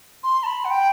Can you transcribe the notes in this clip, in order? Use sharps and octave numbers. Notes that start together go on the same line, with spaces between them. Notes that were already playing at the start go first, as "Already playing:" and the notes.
C6
A5
B5
F#5
G5